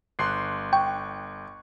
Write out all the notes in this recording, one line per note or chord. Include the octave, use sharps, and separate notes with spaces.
G1 C6 F#6 C7
G5 C#6